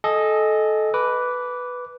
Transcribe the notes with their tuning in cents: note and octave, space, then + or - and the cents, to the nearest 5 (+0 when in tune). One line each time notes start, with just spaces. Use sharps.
A4 -20 D#5 +0 G#5 -10
B4 +0 D6 -15